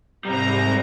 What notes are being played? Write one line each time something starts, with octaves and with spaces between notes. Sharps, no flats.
G#2 C3 G3 C4 A#5